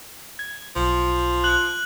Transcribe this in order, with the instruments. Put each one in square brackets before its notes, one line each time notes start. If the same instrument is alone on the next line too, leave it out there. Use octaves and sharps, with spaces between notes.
[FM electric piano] G#6
[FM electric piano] B1 [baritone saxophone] F3
[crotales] F#6 F#7